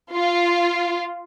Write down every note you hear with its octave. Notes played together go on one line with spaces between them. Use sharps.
F4